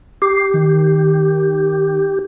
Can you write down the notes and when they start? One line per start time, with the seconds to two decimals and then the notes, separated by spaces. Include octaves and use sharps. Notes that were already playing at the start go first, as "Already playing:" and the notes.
0.22 G4 C7
0.54 D#3